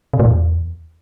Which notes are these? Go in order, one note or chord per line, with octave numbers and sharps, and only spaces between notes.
C3
A2
E2